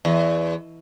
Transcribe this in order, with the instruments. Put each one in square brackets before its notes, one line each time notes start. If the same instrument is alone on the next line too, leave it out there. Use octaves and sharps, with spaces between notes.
[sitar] E2